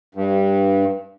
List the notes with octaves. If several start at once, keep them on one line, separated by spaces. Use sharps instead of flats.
G2